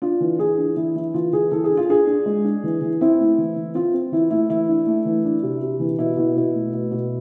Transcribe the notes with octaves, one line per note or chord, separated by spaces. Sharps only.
D4 F4
E3
E3 G#4
D4
E3 E4
E3 E4
E3 F4
E3 G#4
E3 A4
G#4
D4
F4
D4 G#4
D4
G#3
D4
E3
E3
C4 E4
A3
E3
E3
C4 F4
C4
E3 E4
A3 E4
E3 E4
D4
A3
E3
D4
C3
C3
E3
B2 E4
B2
B2
A3
B2
B2